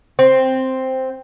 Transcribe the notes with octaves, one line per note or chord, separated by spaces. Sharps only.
C4